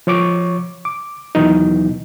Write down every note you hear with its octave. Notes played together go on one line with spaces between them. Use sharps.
F3 C#5 C#6 D6
D6
D#2 B2 E3 F#3 B3 D#4